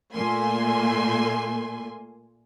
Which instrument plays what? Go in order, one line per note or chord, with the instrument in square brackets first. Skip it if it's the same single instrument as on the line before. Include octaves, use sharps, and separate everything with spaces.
[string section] A#2 A3 A#3 G#5 C6